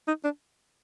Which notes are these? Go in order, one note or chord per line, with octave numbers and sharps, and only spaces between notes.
D#4
D4